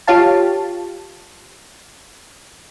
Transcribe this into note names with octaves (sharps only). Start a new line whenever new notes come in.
F4 G4 C#5 F5 A5